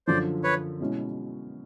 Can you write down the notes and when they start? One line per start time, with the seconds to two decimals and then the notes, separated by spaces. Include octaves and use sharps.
0.07 F#2 D3 F3 C5 D5
0.43 B4 C#5
0.80 B2 G#3 C#4 E4